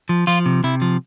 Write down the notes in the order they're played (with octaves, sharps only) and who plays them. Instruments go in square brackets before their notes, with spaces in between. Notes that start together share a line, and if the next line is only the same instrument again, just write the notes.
[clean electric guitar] F3
F3 F4
C3
C3 E4
F3